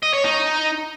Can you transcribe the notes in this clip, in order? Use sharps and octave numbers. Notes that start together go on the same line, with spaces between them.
D#5
C#5
D#4